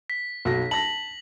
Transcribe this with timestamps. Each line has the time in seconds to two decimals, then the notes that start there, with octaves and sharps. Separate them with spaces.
0.10 B6
0.45 B1 F#4 A#6
0.71 A5 A#6 F#7